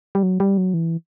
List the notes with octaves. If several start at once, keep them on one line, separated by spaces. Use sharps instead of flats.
G3
F#3
G3
F#3
E3